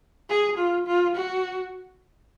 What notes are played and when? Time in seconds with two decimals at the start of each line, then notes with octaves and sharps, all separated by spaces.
0.30 G#4
0.58 F4
0.87 F4
1.16 F#4